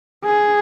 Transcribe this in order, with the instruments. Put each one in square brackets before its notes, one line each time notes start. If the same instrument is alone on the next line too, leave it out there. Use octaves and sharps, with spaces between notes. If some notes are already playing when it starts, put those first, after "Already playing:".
[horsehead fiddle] G#4